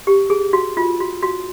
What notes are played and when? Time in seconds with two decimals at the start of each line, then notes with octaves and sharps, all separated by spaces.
0.07 G4
0.30 G#4
0.53 F#4
0.77 F4
1.00 F#4
1.23 F#4